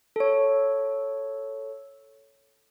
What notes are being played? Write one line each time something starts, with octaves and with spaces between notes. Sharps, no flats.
A4 C#5